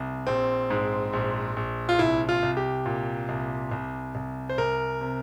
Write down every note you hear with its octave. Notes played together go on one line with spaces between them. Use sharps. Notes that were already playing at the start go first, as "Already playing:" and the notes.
Already playing: C2
A#1 C4
G#2
A#1
A#1
F4
C2 E4
F4
C2
G4
A#2
C2
C2
C2
C5
C2 A#4
C3